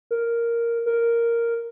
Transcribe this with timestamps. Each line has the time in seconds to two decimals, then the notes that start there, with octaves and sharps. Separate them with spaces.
0.11 A#4
0.86 A#4